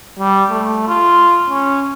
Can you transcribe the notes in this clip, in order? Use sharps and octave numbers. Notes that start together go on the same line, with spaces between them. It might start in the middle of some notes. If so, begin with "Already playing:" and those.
G3
A3
F4
C#4